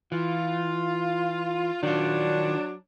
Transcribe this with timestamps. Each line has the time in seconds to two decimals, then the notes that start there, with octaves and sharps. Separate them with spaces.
0.12 E3 F4
1.83 D#3 F#3 D4 F4